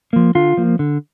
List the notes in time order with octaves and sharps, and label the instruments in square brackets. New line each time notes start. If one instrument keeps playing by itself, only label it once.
[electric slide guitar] F3 A#3
D3 F4
F3 A#3
D3